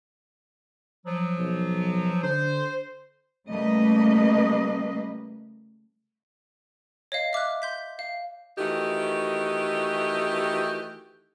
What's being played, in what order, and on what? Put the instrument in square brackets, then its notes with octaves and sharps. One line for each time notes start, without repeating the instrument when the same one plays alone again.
[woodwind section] F3 F#3
[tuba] B1
[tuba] D3 [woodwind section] C5
[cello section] C#3 G3 A3 A#3 B4 D#5
[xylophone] C#5 D#5 F5
E5 D6 F6 F#6
C6 G6 B6
F5
[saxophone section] D#3 E3 A3 F#4 G4